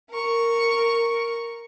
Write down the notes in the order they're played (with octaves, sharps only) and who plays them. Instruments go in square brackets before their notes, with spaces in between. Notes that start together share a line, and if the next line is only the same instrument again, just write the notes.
[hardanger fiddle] A#4 C#6